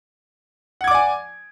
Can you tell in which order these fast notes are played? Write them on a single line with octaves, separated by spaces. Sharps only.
F#5 G#6 D6 D5 G#5